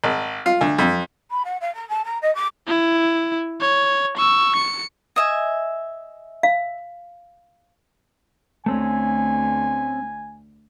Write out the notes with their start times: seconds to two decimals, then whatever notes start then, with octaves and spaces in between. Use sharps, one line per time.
0.04 G#1
0.46 F4
0.61 D2
0.78 F2
1.30 B5
1.45 F#5
1.61 F5
1.75 A#5
1.89 A5
2.04 A#5
2.22 D#5
2.35 D6
2.67 E4
3.61 C#5
4.17 C#6 E6
4.56 C#7
5.16 D#5 E5 G#5
6.43 F5
8.66 D2 A3 C4 C#4 G#5